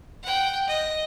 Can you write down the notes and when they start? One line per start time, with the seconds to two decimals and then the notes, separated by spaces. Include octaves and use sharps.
0.23 F#5 G5
0.67 D#5